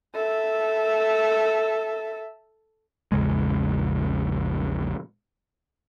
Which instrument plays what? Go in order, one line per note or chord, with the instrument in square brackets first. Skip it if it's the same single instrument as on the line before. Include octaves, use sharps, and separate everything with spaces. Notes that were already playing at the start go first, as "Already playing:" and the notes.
[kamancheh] A4 E5
[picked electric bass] A#1 E2 C#3 G#3